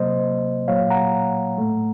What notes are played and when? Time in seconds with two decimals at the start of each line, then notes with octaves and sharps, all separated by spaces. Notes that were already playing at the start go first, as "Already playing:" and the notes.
Already playing: C3 F#3 A#3 C5 D#5
0.68 A#2 F#3 A#3 C#5 F5
0.90 F#5 A#5
1.58 A2 A3